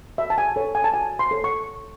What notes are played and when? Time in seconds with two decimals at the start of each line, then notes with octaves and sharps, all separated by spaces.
0.18 F#4 E5
0.30 A5
0.38 G#5
0.56 A4 C#5
0.75 G#5
0.84 A5
0.94 F#4 G#5
1.19 C6
1.31 A4 C#5
1.44 C#6